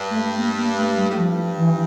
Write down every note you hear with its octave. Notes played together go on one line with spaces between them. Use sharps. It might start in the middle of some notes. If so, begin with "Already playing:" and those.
Already playing: G2
A3
A#3
A#3
A3
G3
A2
G2 F3
E3